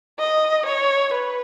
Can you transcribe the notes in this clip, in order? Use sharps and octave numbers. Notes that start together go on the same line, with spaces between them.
D#5
C#5
B4